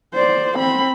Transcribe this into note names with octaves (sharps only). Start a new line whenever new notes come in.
C5 D5
C4 B5